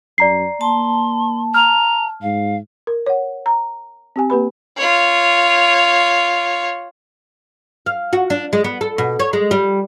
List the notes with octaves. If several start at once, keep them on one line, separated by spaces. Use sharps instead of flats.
F#2 D5 A#5 C7
A#3 A5 C6
A#5 F6
G#2 F5
A#4
C#5 F#5
A#5
C4 G4 G#5
A#3 G4 B4 B5
F4 C#5
F5
F#4
D4
G#3
B3
A4
B2
C#5
G#3
G3